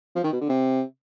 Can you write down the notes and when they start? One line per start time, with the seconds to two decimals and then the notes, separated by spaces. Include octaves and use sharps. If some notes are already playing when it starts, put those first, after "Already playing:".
0.16 F3
0.24 D#3
0.32 B2
0.41 D3
0.49 C3